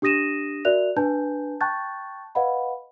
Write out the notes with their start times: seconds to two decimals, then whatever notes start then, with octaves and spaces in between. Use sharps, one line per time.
0.02 D4 G4 D#6 A#6 D#7 E7
0.65 F#4 A#4 D5 E5 F#6 F7
0.97 D4 B4 G#5 A5 G6
1.61 G5 A5 C#6 F#6 G6 A6
2.35 B4 D#5 F5 F#5 B5